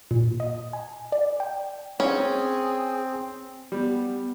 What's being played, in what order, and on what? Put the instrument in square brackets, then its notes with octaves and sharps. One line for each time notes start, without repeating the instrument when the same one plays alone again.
[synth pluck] A#2
D#5
G#5
D5
G5
[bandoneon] C4 [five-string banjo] C#4 [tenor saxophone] G#4
[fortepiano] G3 [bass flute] B3